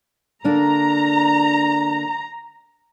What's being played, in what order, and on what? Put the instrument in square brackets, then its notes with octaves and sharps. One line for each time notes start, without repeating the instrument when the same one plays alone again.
[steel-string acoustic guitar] D3 A#3 D4 [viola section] A#5